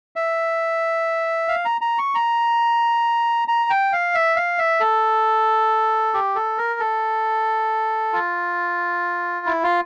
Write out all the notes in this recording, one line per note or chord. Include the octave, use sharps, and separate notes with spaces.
E5
F5
A#5
A#5
C#6
A#5
A#5
G5
F5
E5
F5
E5
A4
G4
A4
A#4
A4
F4
E4
F4